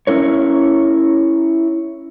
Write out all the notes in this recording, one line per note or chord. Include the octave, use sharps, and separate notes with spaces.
C#4 E4 A#4 C#5